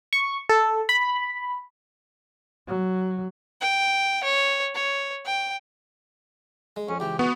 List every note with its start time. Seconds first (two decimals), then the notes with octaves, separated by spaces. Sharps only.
0.13 C#6
0.49 A4
0.89 B5
2.68 F#3
3.61 G5
4.24 C#5
4.75 C#5
5.26 G5
6.76 G#3
6.89 F2 C#4
7.00 C#2 E3 G4
7.19 B3 F#4